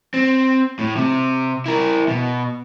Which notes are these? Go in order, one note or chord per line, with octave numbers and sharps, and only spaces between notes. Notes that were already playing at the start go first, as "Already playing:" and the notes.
C4
A2
C3
E4 A#4
B2